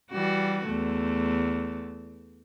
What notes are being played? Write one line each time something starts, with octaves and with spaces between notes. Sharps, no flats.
E3 G3 F#4
E2 A3